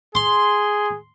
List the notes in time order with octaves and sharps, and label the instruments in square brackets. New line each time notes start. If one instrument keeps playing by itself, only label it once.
[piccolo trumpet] G#4 [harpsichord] C6